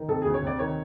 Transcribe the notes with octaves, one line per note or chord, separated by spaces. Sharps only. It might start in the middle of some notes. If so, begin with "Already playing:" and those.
Already playing: D#3
C3 A4
G#4
D2
C#5
C3 D5
D#3 C#5